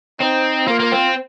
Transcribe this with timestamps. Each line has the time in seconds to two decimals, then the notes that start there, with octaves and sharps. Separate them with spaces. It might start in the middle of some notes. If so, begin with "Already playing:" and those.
0.20 C4 D#4
0.67 A#3 F4
0.80 A#3
0.92 C4